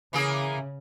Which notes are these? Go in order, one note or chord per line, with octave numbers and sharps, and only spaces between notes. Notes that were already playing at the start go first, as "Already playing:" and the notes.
C#3 E3 A#3 G#4